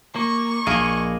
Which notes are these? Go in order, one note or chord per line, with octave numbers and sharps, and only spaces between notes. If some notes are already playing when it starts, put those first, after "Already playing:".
A#3 C#6
A#1 A#3 G#4 D#5